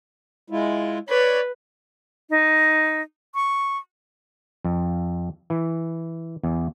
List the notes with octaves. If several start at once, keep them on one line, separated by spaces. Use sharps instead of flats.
G#3 E4 F4
B4 C#5 D5
D#4
C#6
F2
E3
E2